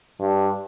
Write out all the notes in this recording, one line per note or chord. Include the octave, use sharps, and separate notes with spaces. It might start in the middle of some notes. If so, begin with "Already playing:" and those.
G2